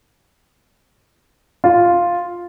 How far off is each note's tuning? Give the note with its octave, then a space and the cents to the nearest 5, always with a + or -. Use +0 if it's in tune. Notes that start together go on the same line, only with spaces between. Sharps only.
F4 +0